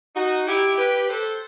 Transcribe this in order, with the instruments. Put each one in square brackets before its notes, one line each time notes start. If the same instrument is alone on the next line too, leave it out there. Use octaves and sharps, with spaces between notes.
[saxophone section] D#4 F#4
E4 G4
G4 B4
A4 C5